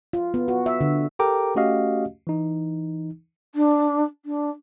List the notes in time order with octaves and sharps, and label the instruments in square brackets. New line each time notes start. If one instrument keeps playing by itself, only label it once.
[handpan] F4
B3
F#4
E5
D3
[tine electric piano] G4 A4 A#4 G5 A#5 D6
A3 C#4 F#4 G4 D#5 F5
E3 D#4
[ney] D4
D4